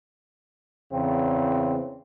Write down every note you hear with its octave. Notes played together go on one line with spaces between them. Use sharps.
E2 C#3 C4